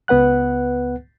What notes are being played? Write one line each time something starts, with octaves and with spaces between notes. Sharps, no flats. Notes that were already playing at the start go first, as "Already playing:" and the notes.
C#2 B3 B4 F#5 F#6